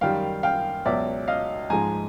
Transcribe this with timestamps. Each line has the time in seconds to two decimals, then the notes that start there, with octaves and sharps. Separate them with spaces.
0.01 F#2 D#3 G3 F5 G5
0.43 F5 G5
0.85 C#2 B2 F#3 D5 E5
1.28 D#5 F5
1.70 G#2 F3 G#3 G#5 A#5